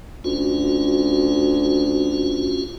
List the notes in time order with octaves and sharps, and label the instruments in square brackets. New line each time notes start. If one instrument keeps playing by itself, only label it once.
[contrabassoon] D2 [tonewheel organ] C#4 F4 F#4